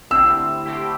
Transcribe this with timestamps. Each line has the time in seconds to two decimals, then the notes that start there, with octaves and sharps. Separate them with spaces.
0.10 D3 A3 C4 E4 G4 E6
0.65 D3 A3 C4 E4 G4